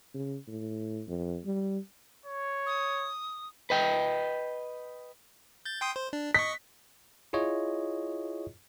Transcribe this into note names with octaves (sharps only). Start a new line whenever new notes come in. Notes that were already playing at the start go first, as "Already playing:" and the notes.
C#3
A2
F2
G3
C#5
D#6
B4 D#5 G5
G6 A6
G5 C6 D#6
C5
D4
D#5 C#6 B6
E4 F4 G#4 C#5 D#5